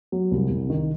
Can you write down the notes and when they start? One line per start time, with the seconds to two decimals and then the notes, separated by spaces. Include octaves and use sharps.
0.12 F#3
0.31 C2
0.50 C2
0.70 D#3